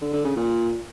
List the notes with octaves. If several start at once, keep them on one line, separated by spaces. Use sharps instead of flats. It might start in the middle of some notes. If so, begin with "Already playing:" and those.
D3
D3
C#3
A#2